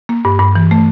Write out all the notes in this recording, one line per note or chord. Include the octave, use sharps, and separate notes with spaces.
A#3
G2
G2
E3
A3